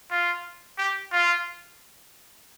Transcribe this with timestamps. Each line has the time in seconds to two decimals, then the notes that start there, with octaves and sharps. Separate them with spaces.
0.11 F4
0.78 G4
1.12 F4